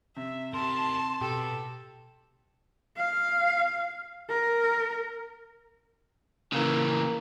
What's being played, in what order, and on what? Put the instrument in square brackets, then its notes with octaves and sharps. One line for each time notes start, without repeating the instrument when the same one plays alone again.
[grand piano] C3 [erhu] E5
[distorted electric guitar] G4 A#4 [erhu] A5 [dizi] C6
[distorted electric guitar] B2 [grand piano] G4 [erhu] A4
[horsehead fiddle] F5
A#4
[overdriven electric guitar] C#3 E3 [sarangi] A#3